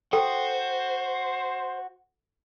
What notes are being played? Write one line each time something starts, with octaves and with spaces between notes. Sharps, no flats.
F#4 A4 C5 G5 A#5